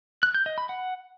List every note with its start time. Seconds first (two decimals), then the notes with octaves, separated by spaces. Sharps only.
0.23 F#6
0.35 G6
0.46 D#5
0.58 B5
0.69 F#5